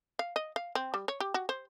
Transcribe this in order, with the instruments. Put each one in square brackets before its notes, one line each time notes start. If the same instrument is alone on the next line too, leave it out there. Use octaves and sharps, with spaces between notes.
[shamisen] F5
D#5
F5
C4
G3
C#5
G4
F#4
C5